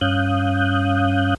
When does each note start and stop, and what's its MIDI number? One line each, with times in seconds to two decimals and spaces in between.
0.01 1.34 43
0.01 1.34 61
0.01 1.34 77
0.01 1.34 87
0.01 1.34 90
0.01 1.34 91